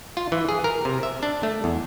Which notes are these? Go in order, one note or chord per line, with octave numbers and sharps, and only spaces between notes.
F4
E3
G#4
A#4
C3
E5
D4
A3
E2